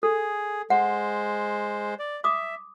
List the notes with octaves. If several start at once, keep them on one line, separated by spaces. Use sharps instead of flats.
G#4 A4
G#3 C5 F#5
D5
E5 D6 D#6